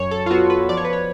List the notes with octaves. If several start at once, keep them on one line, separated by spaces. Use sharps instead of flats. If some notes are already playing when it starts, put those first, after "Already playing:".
Already playing: F#2 C#5
A4
F4
B3 F#4
B4
F3 D5
C#5
B4
C#5